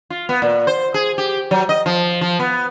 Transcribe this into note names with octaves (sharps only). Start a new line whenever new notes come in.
F4
B3
A#2
C5
G#4
G4
F#3
D#5
F3
F3
B3